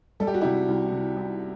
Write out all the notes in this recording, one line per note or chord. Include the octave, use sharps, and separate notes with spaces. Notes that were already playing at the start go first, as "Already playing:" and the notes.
G3 A4
G4
F#4
C3 E4 G4
C2
C3
C2